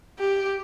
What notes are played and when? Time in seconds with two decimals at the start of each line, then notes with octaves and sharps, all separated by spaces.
0.19 G4